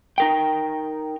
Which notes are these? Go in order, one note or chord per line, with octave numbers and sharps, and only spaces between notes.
D#4 A#4 G5